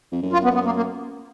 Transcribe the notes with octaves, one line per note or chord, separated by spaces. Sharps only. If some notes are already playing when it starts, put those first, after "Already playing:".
F2
F#2
F4
B3
B3
A#3
A#3